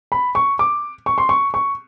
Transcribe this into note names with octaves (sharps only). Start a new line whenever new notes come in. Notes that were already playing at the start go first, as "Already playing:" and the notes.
B5
C#6
D6
C#6
C6
C#6
C#6